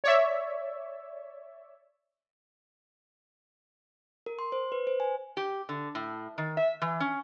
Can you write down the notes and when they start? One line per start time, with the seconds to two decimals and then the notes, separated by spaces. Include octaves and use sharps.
0.04 C#5 D5 E5
4.26 A#4
4.39 C6
4.52 C5
4.72 B4
4.87 C5
5.00 G#5
5.37 G4
5.69 D3
5.95 A2
6.38 D#3
6.57 E5
6.82 E3
7.00 C#4